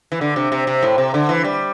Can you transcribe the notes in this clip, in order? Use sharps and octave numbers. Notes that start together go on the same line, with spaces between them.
E3
D3
C3
C3
C3
A2
C3
D3
E3
G3